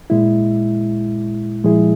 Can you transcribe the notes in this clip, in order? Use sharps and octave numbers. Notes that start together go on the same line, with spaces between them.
A#2 G#3 E4
A#2 F3 G#3 E4 G#4